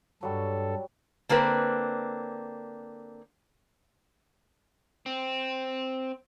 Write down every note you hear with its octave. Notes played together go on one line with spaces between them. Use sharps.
G2 F#3 G3 A4
D3 A#3 C4 B4
C4